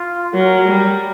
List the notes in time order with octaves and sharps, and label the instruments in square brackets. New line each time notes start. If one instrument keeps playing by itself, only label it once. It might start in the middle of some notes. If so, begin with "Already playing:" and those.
Already playing: [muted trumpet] F4
[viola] F#3 [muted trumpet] A#4
[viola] G3